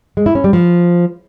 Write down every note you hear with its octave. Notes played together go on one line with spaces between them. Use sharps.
G#3
E4
C#4
G3
F3